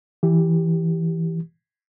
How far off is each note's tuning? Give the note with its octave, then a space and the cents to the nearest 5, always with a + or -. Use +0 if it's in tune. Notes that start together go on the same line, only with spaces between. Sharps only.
E3 +0 G4 +0